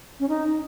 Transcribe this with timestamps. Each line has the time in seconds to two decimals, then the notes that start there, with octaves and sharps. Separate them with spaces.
0.20 C#4
0.29 D#4